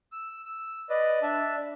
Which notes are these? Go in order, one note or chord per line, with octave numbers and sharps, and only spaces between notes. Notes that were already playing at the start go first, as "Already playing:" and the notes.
E6
E6
B4 D5 D#5
D4 E5 A5